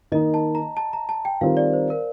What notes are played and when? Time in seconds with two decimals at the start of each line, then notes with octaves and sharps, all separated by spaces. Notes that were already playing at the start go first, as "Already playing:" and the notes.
0.12 D#3 A#3 D#4 D#5
0.34 A5
0.55 A#5
0.77 A5
0.93 A#5
1.09 A5
1.25 G5
1.41 D#3 G3 C4 F4 A#4 F5
1.57 D5
1.73 C5
1.90 A#4